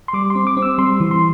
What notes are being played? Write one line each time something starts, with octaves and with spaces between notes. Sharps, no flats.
C6
G3 D6
C4 C6
D6
C4
E6
G3 C6
E3
C6